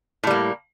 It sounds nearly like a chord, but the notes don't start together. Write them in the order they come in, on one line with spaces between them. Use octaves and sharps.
A2 G3 A#3